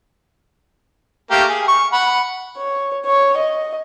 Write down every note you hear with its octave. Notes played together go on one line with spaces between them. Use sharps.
A3 A#3 G4
G#4
C#6
F#5 B5
C#5
C#5
D#5